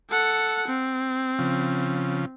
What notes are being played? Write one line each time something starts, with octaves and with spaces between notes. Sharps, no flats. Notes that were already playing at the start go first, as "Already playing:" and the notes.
A4 F#5
C4
C#3 F3